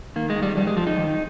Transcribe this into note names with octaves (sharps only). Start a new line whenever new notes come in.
D#3 A#3
G#3
D#3
G3
F2 G3
G#3
F2 F3
D#4
D#3